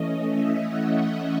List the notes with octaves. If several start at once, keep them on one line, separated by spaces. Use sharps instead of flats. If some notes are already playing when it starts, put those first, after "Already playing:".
Already playing: E3 A3 C#4 D#5
E5
F#5
E5